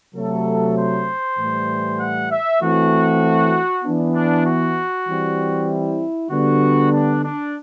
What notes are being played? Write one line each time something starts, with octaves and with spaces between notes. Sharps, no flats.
C3 F#3 A3 A4
C5
A2 E3 G3
F#5
E5
E3 A3 C4 F#4
E3 B3 D4
D4
F#4
E3 G3 C4
E4
D3 G3 B3 F#4
D4
D4